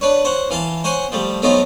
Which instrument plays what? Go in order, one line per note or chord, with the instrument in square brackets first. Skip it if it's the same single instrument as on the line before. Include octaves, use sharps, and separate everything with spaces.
[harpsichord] D4 B4 C#5
C5 C#5 F#5
E3 F5 A5 C6
C5 C#5 F#5 G#5 C6
F3 G3 A3
F#3 A3 B3 C4 D#4 F4